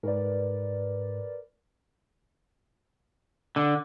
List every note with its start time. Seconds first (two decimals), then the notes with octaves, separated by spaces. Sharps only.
0.03 G#2 A#4 B4 D5
3.56 D3